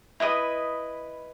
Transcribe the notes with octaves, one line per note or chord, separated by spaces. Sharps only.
E4 B4 D#5 D#6